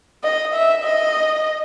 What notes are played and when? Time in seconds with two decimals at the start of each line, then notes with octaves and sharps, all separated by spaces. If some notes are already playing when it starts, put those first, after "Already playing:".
0.24 D#5
0.54 E5
0.83 D#5